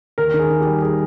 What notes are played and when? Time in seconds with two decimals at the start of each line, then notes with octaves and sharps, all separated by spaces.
0.18 D#2 A#4
0.34 D#3
0.39 G#4
0.50 D#3
0.61 G3 G4
0.82 G#4